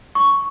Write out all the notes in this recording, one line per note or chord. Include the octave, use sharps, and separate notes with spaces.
C#6